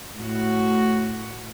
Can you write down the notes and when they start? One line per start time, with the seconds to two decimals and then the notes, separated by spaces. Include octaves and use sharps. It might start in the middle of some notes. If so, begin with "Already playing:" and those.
0.15 A2 F#4